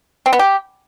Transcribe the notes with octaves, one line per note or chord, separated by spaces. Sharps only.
C4
B3
G4